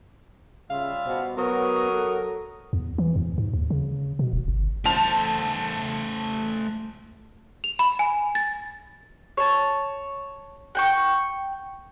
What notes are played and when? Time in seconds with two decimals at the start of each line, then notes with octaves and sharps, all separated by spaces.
0.70 C#3 G3 F4 E5 F5
1.06 B2 C5
1.37 F#3 B3 A#4 C#6 D#6
1.92 A4
2.73 E2
2.98 E3
3.16 E2
3.38 G#2
3.54 D#2
3.70 C#3
4.19 B2
4.33 D1
4.48 G1
4.85 A3 C5 A5 F7
7.64 F7
7.79 B5
7.99 G#5
8.35 A6
9.37 C#5 A5
10.75 F#5 G5 C#6